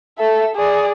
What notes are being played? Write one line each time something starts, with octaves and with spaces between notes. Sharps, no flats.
A4 E5
G#4 D5